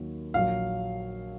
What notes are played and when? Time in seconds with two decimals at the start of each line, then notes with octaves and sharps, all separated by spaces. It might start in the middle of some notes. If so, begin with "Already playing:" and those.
Already playing: D#2 D#3 F#3 A#3
0.34 A#1 A#2 F#3 F5